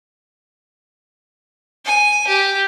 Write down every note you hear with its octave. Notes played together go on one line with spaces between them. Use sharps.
G#5
G4